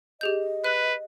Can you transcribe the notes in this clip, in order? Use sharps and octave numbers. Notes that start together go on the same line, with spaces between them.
G4 G#4 D#5 G6
B4 F#6